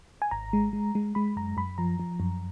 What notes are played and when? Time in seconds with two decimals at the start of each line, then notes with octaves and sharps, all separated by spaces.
0.22 G#5
0.31 G#1 A#5
0.53 G#3
0.73 G#3
0.95 G#3
1.15 G#3 B5
1.36 F#2 A#5
1.57 F#2 B5
1.78 F3 A#5
2.00 F3
2.20 F#2